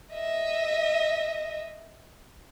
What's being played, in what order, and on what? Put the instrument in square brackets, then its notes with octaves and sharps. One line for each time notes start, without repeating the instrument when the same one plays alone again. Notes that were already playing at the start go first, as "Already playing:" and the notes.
[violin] D#5 E5